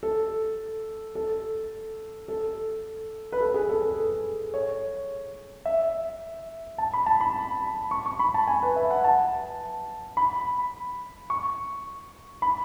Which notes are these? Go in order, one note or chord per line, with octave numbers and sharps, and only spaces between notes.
A4
A4
A4
B4
A4
G#4
A4
A4
C#5
E5
A5
B5
A5
B5
C#6
C#6
B5
A5
G#5
B4
E5
F#5
A5
B5
C#6
B5